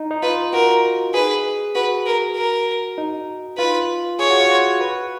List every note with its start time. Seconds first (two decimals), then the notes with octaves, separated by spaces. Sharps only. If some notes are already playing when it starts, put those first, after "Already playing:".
Already playing: D#4
0.11 D#4
0.23 F4 B4
0.53 F#4 A#4
1.14 G#4 B4
1.75 F#4 B4
2.06 A#4
2.36 A#4
2.98 D#4
3.58 F4 B4
4.19 G#4 C#5
4.30 F#4
4.40 F4
4.51 F#4
4.81 B4